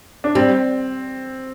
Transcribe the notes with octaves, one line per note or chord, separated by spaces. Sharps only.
D4
G3 C4